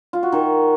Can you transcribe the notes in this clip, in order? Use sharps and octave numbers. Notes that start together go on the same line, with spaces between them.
F4
F#4
D#3